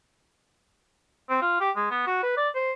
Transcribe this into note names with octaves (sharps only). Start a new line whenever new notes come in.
C4
F4
G4
G#3
B3
F#4
B4
D5
C5